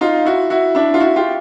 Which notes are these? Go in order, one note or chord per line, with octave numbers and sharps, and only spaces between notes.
D#4 F4
E4 F#4
E4 F#4
D4 E4
F4
E4 F#4
F4 G4